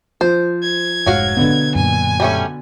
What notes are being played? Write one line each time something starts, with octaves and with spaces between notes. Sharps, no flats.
F3 C5
G#6
F1 G#2 F#3 F#4 F5
B2 D3 B3
F#2 A#2 G#5
G3 A3 C#4